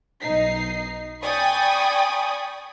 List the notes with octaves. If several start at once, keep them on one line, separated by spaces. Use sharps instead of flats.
B1 D#4 C7
D5 G5 G#5 B5 C#6 D#6